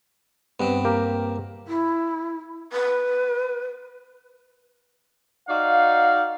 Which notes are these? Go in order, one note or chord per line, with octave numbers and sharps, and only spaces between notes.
G2 B3 C4
A#3 G4 A#4
E4
B4
D#4 F#4 D5 F5